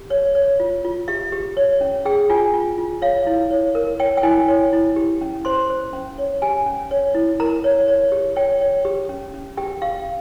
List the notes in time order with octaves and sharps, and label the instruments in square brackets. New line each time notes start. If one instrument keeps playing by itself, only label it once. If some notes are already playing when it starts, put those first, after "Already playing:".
Already playing: [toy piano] G4
C#5
C#5
F4
F4
G4 E5
G4
C#5
C#4
G#4 G5
F4 G#5
F4
F4
C#5 F5
E4
C#5
A#4
C#5 G5
G5
E4 G#5
C#5
E4
G4
C#4
C5 C6
C5
C#4
C#5
G4 G#5
C#4
C#5
E4
A#4 A#5
C#5
C#5
G4
C#5 G5
C#5
G4
C#4
C#4
G4 G5
G4 F5